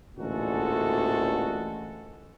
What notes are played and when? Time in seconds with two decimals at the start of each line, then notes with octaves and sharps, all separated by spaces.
0.18 A1 D2 A#2 G#3 F#4 A4